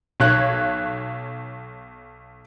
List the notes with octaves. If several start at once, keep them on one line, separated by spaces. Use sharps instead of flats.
B1 C#5 F#6